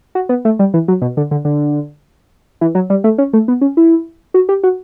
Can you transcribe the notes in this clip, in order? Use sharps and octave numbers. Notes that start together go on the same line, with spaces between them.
F#4
B3
A3
G3
E3
F#3
B2
D3
D3
D3
E3
F#3
G3
A3
C#4
A3
B3
C#4
E4
F#4
G4
F#4